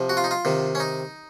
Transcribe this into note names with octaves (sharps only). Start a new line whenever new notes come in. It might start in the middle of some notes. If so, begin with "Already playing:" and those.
Already playing: C3 F3
F#4
F4
D#4
F4
C3 D#3
C#4
D#4